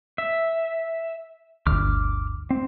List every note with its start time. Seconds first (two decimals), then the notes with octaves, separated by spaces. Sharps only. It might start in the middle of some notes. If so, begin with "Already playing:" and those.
0.18 E5
1.67 G1 D2 D6 F6
2.51 C4